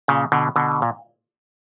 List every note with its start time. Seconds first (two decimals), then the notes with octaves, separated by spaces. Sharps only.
0.08 A#2 C#3
0.32 B2 D3
0.56 B2 D3
0.82 A#2